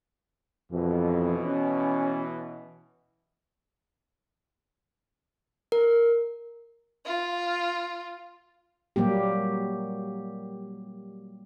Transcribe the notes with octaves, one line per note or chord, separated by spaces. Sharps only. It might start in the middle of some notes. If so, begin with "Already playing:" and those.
F2 B2 E3
C#4
A#4
F4
F#3 G3 A#3 G4